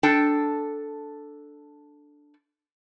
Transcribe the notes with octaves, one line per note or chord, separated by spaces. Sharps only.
D4 A4 G5